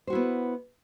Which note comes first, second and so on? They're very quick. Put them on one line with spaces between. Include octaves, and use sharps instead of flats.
C5 F#4 E4 B3